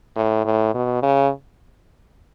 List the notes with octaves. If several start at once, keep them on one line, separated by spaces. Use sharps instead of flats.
A2
A2
B2
C#3